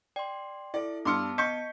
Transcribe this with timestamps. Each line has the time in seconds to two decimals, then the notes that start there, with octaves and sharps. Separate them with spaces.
0.16 D5 G5 C6
0.74 E4 A4 D5
1.05 G2 B3 A5 C6 D6 E6 F6 C#7
1.38 D#5 C#6 G6 B6 C#7